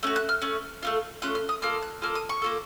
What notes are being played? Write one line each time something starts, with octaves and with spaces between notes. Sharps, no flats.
A3 C#4 F#4
F#6
F6
A3 C#4
A3 C#4 F4
A3 C#4 F4 F#6
F6
D#6
A#3 F4 A4 F6
F#6
A#3 F4 A4 F6
D#6
C#6
A#3 F4 A4